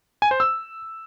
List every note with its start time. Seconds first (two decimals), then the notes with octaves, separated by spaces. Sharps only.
0.22 G#5
0.31 C5
0.40 E6